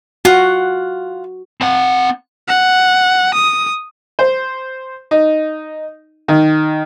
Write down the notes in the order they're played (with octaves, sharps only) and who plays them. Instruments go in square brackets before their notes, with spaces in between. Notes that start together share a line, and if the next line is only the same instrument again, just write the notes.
[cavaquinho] F4 F#5 [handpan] F#4
[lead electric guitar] C4 F#5
[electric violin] F#5
D#6
[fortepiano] C5
D#4
D#3